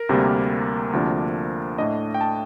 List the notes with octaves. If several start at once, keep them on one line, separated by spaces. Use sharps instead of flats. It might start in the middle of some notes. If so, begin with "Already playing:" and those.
Already playing: A#4
D2 C3 G3 A#3
D2 C3 F3 A#3 D4
A2 A3 D4 D#5
G5
A5